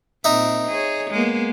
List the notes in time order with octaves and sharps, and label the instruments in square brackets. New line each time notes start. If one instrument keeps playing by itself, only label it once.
[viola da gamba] A#2 C4 [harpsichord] D#4 E5
[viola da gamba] G#4 C#5
G#3 A#3 B3